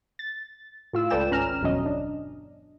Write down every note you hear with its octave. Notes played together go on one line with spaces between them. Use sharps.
A6
A2 F4 E6
C#2 A4 B4 D5 G5 E7
G#1 C#4 A#5 F6 E7
G1 E2 B2 F#3 C#4 D#5
D4